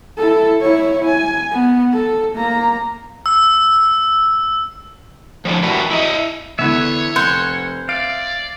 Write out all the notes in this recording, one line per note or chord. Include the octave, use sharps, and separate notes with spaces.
E4 A4
E4 C#5
G#5
B3
A4
A#3 A#5
E6
A2 D3 F3
E3 F#3 F#4 G4 A#4 B4
E4 D#5
E2 D3 E3 B4 C#5 E5
F1 C5 F#5
D5 E5 F5 D7